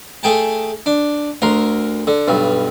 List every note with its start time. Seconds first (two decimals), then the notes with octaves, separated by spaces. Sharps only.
0.23 A3 G#4 G5 A5
0.86 D4
1.42 D2 A#4 C6
2.07 D3
2.28 B1 G2